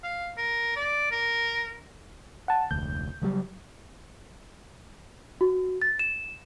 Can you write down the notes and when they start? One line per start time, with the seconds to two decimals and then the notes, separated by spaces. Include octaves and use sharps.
0.03 F5
0.37 A#4
0.76 D5
1.11 A#4
2.48 F#5 A5
2.71 F1 D2 G6
3.22 C#3 F#3 G3
5.41 F#4
5.82 A6
5.99 E7